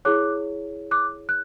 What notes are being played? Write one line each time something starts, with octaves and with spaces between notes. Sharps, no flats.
E4 G#4 C#5 D6 F#6
D6 F#6
F#6